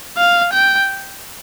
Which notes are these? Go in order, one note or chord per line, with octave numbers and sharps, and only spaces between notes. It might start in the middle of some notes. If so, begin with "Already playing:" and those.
F5
G5